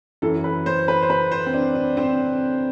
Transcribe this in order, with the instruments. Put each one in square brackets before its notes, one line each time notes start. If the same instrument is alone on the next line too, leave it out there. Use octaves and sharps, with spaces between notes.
[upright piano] F#2 E3 A4
B4
C5
B4
C5
B4
C5
C4
D4
D4
C4